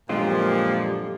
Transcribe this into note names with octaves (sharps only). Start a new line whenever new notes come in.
F#2 A#2 D3 F3 G#3 C4 F4 G4